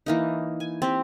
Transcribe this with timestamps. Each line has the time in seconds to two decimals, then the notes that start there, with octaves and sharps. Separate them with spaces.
0.06 E3 A#3 D#4
0.60 G#5
0.82 C4 G4